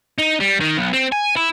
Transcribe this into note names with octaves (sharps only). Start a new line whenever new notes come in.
D#4
G3
D#3
B1
C4
G#5
E4